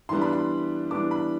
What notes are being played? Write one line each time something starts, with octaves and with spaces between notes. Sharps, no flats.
E3 G3 B3 D4 C6
B5
C6
E3 G3 B3 D4 D6
B5